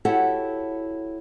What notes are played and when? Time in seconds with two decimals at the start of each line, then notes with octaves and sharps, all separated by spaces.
0.05 E4 F#4 G4 A4 C#5 F#5